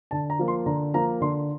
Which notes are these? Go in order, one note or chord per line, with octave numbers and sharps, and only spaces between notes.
D3 A5
A#5
F3 A#3
C6
D3 A#5
F3 A#3 A#5
D3 C6